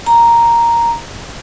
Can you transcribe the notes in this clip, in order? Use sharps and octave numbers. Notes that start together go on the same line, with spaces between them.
A#5